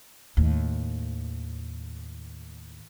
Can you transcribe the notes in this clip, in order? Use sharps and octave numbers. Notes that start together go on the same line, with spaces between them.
D#2 A2